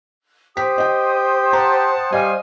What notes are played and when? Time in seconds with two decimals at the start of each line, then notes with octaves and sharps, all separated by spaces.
0.57 G4 C5 D#6 B6
0.78 D#5 G5
1.53 F#5 G5 A5 A#5
2.12 G3 D#5 F5 G#5